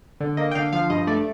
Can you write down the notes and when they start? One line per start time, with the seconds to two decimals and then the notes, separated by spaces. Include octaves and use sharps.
0.20 D3
0.37 A#3 D#5
0.51 G5
0.55 D3 F5
0.73 F3 F5
0.90 G2 D#5
1.07 A3 D5